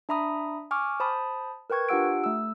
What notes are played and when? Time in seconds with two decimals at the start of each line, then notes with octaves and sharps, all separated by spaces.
0.09 D4 E5 A#5 B5 D#6
0.71 G#5 C#6 D6 F6
1.00 C5 A5 B5 D#6
1.70 A#4 B4 G5 C#6 G#6
1.89 D4 F4 G4 F#5 E6 D7
2.24 A3 E6